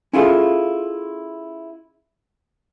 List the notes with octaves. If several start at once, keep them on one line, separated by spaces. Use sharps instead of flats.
C#4 E4 F4 G#4 A4 F5